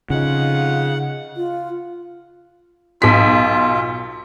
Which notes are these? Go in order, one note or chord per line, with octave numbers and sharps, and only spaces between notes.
F2 C#3 D#4 F4 F#5
F4
B1 F4 B6